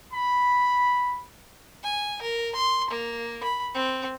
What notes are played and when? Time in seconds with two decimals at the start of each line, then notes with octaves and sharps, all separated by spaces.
0.13 B5
1.83 G#5
2.22 A#4
2.55 C6
2.91 A#3
3.43 B5
3.75 C4